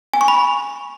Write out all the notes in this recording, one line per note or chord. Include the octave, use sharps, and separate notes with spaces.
G#5
C#6
B5